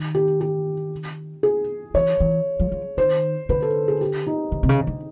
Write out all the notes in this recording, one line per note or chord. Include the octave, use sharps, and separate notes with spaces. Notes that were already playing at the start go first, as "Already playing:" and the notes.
Already playing: D#3
G4
G4
G#4
E3 C#5
E3
F3
F3
D#3 C5
D3 B4
A4
G#4
G4
D#4
D3
C3
C#3
D3